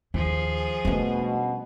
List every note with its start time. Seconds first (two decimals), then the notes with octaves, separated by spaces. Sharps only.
0.14 D#2 F3 G#4
0.85 B2 G3 A3 C#4 D4